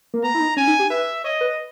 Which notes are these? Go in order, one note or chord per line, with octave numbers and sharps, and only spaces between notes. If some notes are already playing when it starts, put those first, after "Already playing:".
A#3
B3 A#5
E4
D#4
C#4 G#5
D#4
G4
B4 E5
C#5 D#5
B4